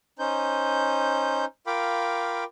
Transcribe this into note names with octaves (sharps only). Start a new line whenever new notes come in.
C#4 D#4 C5 G6
F4 A#4 F5 G5 B5 D6